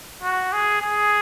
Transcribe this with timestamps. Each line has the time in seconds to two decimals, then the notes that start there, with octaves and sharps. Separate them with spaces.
0.23 F#4
0.53 G#4
0.82 G#4